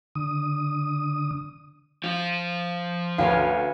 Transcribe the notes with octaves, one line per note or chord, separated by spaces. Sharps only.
D3 D#6
F3 F4
D2 B4 C#5 F5